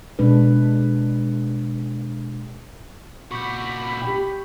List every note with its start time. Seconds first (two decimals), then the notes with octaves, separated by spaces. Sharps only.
0.19 B2 G#3 D4 B4
3.31 A#2 F#4 B5 C#6 D6 G6
4.02 G4 G5